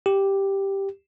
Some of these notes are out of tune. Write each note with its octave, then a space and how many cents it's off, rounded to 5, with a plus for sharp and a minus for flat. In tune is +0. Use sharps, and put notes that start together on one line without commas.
G4 +0